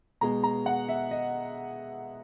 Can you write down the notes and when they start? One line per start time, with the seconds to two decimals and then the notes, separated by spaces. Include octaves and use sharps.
0.21 B2 G#3 A#5
0.44 A#5
0.66 F#5
0.89 E5
1.11 D#5